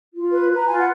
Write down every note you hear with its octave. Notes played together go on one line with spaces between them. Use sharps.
F4
B4
B4
A#5
F4 G#5
F#5